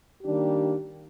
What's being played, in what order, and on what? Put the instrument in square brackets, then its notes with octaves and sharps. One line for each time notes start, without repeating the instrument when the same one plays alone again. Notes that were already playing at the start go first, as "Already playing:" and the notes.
[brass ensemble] D#3 G3 A#3 D4 G4